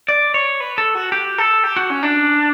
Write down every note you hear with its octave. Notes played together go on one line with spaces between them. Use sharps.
D5
C#5
B4
A4
F#4
G4
A4
G4
F#4
C#4
D4